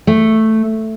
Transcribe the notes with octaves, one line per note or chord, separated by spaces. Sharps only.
A3